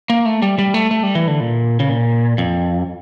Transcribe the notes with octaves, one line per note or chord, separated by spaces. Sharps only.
A#3
A3
G3
G3
A3
A3
G3
E3
D3
A#2
C#3
A#2
F2